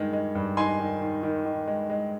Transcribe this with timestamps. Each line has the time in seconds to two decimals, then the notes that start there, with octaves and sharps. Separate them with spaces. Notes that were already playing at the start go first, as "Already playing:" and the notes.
Already playing: G2 D#3 G#3
0.13 G#3
0.35 G2
0.57 D#4 G#5 C6
0.79 D#3
1.01 D#3
1.23 D#3
1.45 D#3
1.67 G#3
1.90 G#3